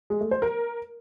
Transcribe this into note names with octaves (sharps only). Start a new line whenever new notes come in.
G#3
A3
C5
A#4